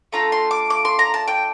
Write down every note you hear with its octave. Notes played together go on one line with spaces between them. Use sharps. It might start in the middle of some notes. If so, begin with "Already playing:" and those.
A3 D4 F4 A4 A#5
C6
D6
D6
C6
A#5
A5
G5